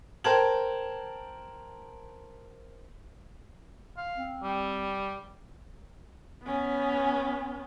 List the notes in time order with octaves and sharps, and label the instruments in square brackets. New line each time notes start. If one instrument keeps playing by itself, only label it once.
[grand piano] A#4 C5 G5 A5 G#6 F#7
[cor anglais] F5
[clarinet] C4
[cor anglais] G3
[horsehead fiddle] B3 C#4